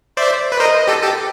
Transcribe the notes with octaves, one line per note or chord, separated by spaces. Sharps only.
C5 D5 E5
B4
A#4 C5 D#5
G4 A4
G4 A4